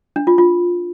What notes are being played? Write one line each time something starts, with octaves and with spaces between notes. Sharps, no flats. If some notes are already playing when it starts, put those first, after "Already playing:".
D4
F4
F4